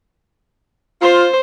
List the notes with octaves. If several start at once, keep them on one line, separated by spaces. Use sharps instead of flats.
F4 C5